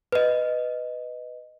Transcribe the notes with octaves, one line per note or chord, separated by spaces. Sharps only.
B4 D#5